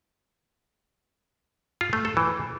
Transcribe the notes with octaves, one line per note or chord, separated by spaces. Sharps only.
F4
A3
A4
E3